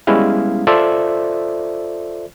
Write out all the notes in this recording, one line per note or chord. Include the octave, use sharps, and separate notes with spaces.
G3 G#3 B3 C#4 E4 F5
F4 A4 C5 D5 E5